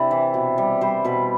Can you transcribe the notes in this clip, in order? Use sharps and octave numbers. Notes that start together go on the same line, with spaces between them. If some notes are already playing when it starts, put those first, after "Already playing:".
Already playing: C3 D4 E4 D5
E3
B2
G3
G3 C5
B2 B4